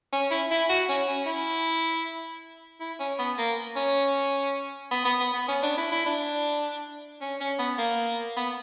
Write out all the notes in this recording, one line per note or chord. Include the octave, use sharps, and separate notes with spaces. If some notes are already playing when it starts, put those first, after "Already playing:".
C#4
E4
E4
F#4
C#4
C#4
E4
E4
C#4
B3
A#3
C#4
B3
B3
B3
B3
C#4
D4
E4
E4
D4
C#4
C#4
B3
A#3
B3